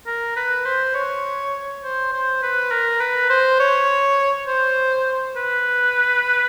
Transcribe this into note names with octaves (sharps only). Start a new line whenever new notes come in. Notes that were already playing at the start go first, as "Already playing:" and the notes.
A#4
B4
C5
C#5
C5
C5
B4
A#4
B4
C5
C#5
C5
B4